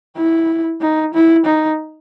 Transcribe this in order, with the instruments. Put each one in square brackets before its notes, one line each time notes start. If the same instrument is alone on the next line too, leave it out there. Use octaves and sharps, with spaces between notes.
[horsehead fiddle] E4
D#4
E4
D#4